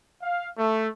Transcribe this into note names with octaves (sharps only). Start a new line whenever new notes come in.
F5
A3